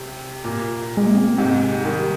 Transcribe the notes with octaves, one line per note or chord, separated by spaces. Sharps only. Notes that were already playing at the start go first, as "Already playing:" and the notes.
Already playing: C3
A#2
G#3
A#3
C4
G#2 C3
D#3 G3